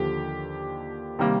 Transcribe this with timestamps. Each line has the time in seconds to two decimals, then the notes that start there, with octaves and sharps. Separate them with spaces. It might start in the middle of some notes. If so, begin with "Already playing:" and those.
Already playing: D#2 D3 F3 G4
1.19 C3 D#3 G3 A#3